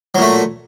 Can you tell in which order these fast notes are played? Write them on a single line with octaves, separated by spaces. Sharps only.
F#3 A#2 A3